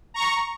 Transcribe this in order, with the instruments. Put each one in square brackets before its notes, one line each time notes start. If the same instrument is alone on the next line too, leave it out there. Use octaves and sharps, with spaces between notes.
[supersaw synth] A#5 C#6